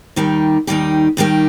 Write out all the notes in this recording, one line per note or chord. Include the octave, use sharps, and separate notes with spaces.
D#2 D#3 G3 D#4 G4
D#2 D#3 G3 D#4 G4
D#2 D#3 G3 D#4 G4